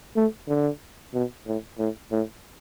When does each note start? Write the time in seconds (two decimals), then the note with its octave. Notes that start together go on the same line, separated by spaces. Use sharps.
0.16 A3
0.48 D3
1.14 B2
1.46 A2
1.78 A2
2.11 A2